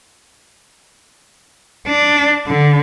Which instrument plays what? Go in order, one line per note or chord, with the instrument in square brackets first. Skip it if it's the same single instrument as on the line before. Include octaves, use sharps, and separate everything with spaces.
[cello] D4
D3